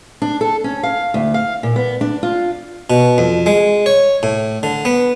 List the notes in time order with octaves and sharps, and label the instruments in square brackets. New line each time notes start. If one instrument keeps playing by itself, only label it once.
[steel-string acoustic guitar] D4
A4
C#4
F5
D2
F5
A#2
B3
D4
F4
[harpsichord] B2
F2
G#3
C#5
A2
D3
B3